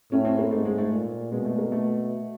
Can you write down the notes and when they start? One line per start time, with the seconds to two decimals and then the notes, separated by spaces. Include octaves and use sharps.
0.12 A2 C#4
0.25 C4
0.39 A#3
0.51 G#2 A3
0.65 G#3
0.78 A3
0.91 A#2
1.32 B2 G#3
1.45 A3
1.58 A#3
1.72 A3